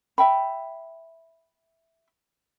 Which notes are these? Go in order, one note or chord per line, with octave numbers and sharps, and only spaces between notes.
E5 G5 B5